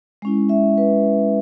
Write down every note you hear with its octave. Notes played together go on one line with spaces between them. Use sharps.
G#3 C#4 E4
E5
B4